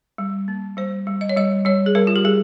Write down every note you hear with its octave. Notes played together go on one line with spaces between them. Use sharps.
G3
A#3
G3 C5
G3
D#5
C#5
G3 D#5
G3 C#5
G#4
G3 A#4
F4
G4
G3 G#4